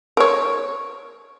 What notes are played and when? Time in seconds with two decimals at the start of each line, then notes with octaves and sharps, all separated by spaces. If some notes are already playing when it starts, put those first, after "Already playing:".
0.17 A#4 C#5